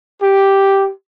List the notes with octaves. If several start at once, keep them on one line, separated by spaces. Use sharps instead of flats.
G4